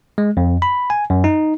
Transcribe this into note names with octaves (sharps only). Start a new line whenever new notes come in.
G#3
F2
B5
G#5
F#2
D#4